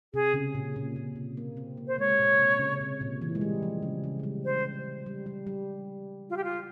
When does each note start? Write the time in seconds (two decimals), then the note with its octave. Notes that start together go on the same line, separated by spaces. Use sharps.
0.14 C3 G#4
0.34 C#3
0.55 A#2
0.76 A#2
0.96 A#2
1.16 C3
1.37 A#3
1.57 C4
1.77 A#3
1.87 C5
1.98 G#3 C#5
2.19 A#2
2.39 C3
2.59 C#3
2.81 C3
3.01 A#2
3.22 E3
3.35 G#3
3.41 G3
3.63 F3
3.82 C#3
4.04 C#3
4.19 G#3
4.23 G3
4.44 C5
5.06 G3
5.26 G3
5.47 G3
6.29 F4
6.36 G4
6.43 F4